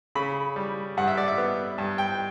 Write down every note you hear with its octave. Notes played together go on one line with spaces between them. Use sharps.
C#3 B5
G3
G2 F#5
E5
D5
E5
B3
G2
G5